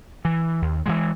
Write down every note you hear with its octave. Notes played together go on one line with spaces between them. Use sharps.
E3
D#2
E3 F3 G#3